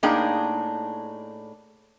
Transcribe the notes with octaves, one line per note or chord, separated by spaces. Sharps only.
A2 A#3 D4 D#4 G#4 G5